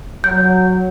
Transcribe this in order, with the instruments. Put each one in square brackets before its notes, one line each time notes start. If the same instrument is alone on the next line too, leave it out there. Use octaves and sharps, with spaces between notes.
[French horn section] F#3 [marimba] G6